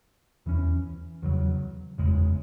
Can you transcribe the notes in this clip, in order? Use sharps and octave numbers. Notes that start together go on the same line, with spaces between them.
E2 E3 C#4
E2 C#3 F#3
F#1 E2 C#3 G#3